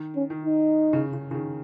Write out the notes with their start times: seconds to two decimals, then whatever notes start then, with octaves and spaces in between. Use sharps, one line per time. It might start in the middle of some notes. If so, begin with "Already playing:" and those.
Already playing: D#3
0.15 C#4
0.30 D#3
0.44 D#4
0.93 C#3
1.13 C#3
1.31 C#3
1.34 D#3